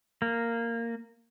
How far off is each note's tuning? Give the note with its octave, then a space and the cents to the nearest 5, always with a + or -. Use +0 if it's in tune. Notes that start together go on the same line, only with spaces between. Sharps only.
A#3 -10